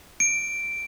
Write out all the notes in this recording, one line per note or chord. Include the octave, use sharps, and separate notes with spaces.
D7